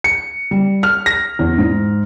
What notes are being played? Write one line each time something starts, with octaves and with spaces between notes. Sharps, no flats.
C#7
G3
F6
A#6
E2
G#2